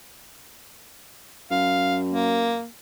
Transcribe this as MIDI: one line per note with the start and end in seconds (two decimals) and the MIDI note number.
1.51 2.60 42
1.51 1.97 77
2.10 2.67 58